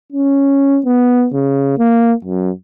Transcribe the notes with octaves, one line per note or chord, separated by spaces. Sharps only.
C#4
B3
C#3
A#3
F#2